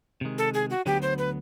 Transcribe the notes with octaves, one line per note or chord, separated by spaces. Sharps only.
C3 D#3 G#3
A4
G#4
F#4
D2 D3 F#3 B3 G4
C5
B4